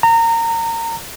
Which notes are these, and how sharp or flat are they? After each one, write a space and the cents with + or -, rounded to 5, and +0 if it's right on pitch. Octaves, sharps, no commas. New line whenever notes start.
A#5 -25